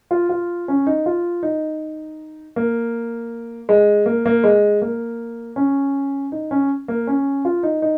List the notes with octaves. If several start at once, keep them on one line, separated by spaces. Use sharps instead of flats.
F4
F4
C#4
D#4
F4
D#4
A#3
G#3
A#3
A#3
G#3
A#3
C#4
D#4
C#4
A#3
C#4
F4
D#4
D#4